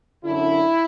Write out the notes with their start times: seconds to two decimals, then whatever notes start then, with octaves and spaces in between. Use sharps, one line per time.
0.24 F#2 D3 E4